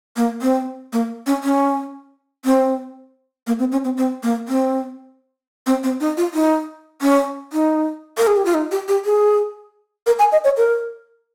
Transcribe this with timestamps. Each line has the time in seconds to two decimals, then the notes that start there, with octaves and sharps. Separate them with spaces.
0.16 A#3
0.42 C4
0.93 A#3
1.26 C#4
1.44 C#4
2.45 C4
3.47 A#3
3.59 C4
3.72 C#4
3.85 C4
3.97 C4
4.23 A#3
4.48 C4
5.67 C4
5.83 C4
6.00 D#4
6.17 F4
6.34 D#4
7.02 C#4
7.53 D#4
8.18 A#4
8.27 G#4
8.37 G4
8.45 F4
8.54 D#4
8.71 G4
8.88 G4
9.05 G#4
10.07 A#4
10.19 G#5
10.32 D#5
10.44 C#5
10.57 A#4